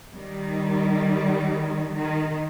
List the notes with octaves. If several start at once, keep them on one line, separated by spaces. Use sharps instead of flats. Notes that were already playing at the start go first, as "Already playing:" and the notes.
D#3 G3
D#3